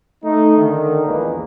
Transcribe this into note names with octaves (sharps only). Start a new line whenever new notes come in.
A3 D#4
D3 D#3
A#1 E2 G#3 A#3 B4